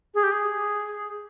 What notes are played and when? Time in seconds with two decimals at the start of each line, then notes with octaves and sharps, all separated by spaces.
0.14 G#4
0.23 G4
0.32 G#4